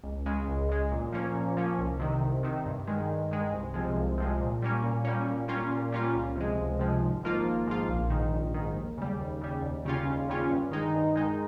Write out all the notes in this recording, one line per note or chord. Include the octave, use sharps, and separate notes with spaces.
C#2
C#3 G#3
C#2
C#3 G#3
A#2
F3 A#3 C#4
A#2
F3 A#3 C#4
C2
C3 D#3
C2
C3 D#3
G2
D#3 G#3
G2
D#3 G#3
C2
C3 F3 G#3
C2
C3 F3 G#3
A#2
G3 A#3 C#4
A#2
G3 A#3 C#4
A#2
G3 A#3 C#4 F4
A#2
G3 A#3 C#4 F4
C#2
C3 F3 G#3
C#2
C3 F3 G#3
G#1
G#2 F3 A#3 F4
G#1
G#2 F3 A#3 F4
A#1
G#2 D#3
A#1
G#2 D#3
D#2
C#3 G3
D#2
C#3 G3
D#2
C#3 G3 C#4 F4
D#2
C#3 G3 C#4 F4
G2
D#3 G#3 D#4
G2
D#3 G#3 D#4